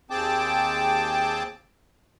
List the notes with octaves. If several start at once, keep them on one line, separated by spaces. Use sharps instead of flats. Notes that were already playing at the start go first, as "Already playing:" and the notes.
D#2 C4 G#4 G5 A5 D6